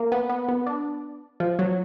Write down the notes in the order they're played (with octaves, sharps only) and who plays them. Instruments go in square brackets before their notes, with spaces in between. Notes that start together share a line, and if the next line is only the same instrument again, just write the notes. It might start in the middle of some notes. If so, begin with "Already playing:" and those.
Already playing: [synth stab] A#3
B3
B3
B3
D4
F3
F#3